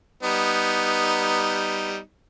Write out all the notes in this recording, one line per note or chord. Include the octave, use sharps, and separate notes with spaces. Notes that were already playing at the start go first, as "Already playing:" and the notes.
G3 B3 D#4